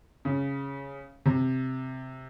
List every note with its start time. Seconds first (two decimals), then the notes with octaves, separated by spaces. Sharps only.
0.25 C#3
1.26 C3